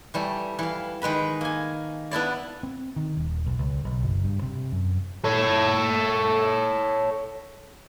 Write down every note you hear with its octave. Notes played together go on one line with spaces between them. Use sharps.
E3 G3 A3
E3 F5
D#3 G#3 B4 B5
A#3 G#5
B3 D4 E4 D5
C4
D#3
D#1
B1
C#2
B1
F#1
G2
C3
F#2
A4 C#5